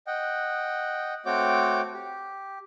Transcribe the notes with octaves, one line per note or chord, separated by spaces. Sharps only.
D#5 F#5 G5
A3 C4 F#4 C#5 G5 D6
G4